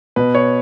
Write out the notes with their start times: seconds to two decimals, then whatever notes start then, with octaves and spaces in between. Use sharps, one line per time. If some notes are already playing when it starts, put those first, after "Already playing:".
0.16 B2 B4
0.35 C#5